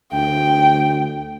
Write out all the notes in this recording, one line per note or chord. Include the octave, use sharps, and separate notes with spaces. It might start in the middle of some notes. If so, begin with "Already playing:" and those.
D2 G5